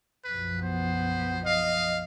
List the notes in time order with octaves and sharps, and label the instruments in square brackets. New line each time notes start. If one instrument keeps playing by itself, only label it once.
[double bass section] B1 F#2 F3 [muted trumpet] B4
[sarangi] B3 [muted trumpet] C5
[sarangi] D#5 [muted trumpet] F5